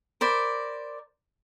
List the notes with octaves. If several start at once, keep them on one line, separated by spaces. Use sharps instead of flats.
A#4 C5 D5 B5